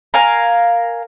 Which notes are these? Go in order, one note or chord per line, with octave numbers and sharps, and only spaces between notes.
A#4 F5 G#5